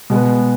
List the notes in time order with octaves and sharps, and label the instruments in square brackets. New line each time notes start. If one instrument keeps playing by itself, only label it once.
[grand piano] B2 G#3 B3